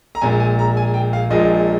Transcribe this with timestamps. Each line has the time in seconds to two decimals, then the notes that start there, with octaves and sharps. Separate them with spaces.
0.15 A#5
0.21 A#1 A#2 G#3 G#5
0.40 G#5
0.59 A#5
0.77 G#5
0.94 G5
1.13 F5
1.30 A#1 A#2 F3 G#3 D#5